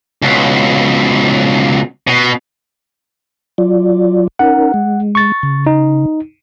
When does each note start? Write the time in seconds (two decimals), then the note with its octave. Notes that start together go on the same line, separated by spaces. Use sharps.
0.22 C#2 B2
2.07 B2
3.58 F#3 F4 D5
4.39 C#4 D#4 A#4 F#5
4.74 G#3
5.15 C#6 A6
5.43 C#3
5.66 D#4